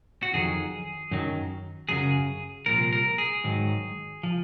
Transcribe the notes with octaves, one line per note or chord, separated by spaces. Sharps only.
F#4
F2 D#3 F#3 G#4
F#2 D#3 F#3
F#2 C#3 F#3 G#4
C2 A#2 F3 A#4
A#4
G#4
G#2 D#3 F#3
F3